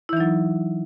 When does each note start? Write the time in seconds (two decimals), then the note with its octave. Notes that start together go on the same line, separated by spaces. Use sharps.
0.09 E4
0.13 E3
0.17 D#4
0.20 F#3